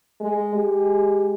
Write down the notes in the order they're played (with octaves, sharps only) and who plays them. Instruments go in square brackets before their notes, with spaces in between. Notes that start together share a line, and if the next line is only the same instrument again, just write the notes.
[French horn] G#3
[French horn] G#3 [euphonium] G4